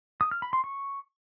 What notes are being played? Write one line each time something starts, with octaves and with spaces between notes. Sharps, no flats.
D#6
F6
B5
C6
C#6